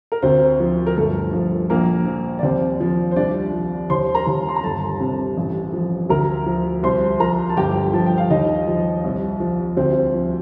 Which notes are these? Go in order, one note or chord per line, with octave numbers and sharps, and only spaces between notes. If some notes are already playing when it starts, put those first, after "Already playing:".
A#4
D2 C4 C5
F3
A#4
G1 A3 A4
F3
A#1 A#3 A#4
F3
D5
D#2 C4 C5
F3
C5
C2 D4 D5
F3
D#2 C5 C6
A#4 A#5
D#2
C6
A#5
G1 A4 A5
C3
A1
F3
D2 A#4 A#5
F3
C2 C5 C6
F3 A#4 A#5
A5
G1 G4 G5
F3 A5
G5
F5
D#2 D#4 D#5
F3
C2
F3
D2 C4 C5
F3